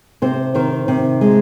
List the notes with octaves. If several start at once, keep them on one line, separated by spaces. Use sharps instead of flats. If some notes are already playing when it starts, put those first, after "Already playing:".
C3 C5
D#3 C5
C3
G#3